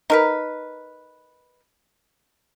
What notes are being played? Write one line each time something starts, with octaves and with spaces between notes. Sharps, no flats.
D#4 A#4 B4